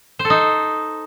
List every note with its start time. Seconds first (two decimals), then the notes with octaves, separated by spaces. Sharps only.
0.19 C5
0.25 A4
0.30 D#4